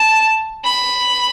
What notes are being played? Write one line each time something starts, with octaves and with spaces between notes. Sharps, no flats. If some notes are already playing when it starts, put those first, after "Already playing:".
Already playing: A5
B5